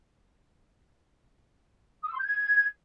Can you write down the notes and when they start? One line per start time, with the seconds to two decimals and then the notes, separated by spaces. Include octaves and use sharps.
2.03 D#6
2.08 E6
2.14 C6
2.19 G6
2.24 G#6